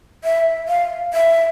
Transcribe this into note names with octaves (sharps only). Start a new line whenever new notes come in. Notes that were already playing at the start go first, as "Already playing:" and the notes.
E5
F5
E5